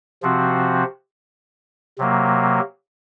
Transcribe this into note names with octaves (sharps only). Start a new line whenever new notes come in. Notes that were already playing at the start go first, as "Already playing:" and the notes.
C3 F3 C4 F#4
C3 F#3 A#3